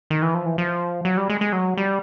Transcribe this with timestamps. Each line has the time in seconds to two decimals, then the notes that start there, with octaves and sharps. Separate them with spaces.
0.10 D#3
0.22 E3
0.34 F3
0.46 E3
0.58 F3
1.05 F#3
1.17 G3
1.30 G#3
1.41 G#3
1.53 F#3
1.77 G3